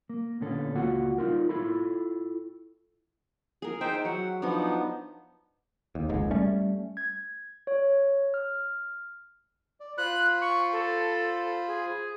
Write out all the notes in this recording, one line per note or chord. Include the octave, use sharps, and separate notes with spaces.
A#3
A#2 D3 B3 C#4 A4
C#2 A#3 F4 F#4 F#5
D#4 F4 A#4
E4 F4 A4 B5
G#4 A#4
D#4 C5 E5 G5
F#3 F#5
F3 B3 D4 D#4
D#2
F1 C#2 G#2
G3 A3 C#4
G#6
C#5
F6
D5
F4 C5 B5 F#6
C#6
A4
G#4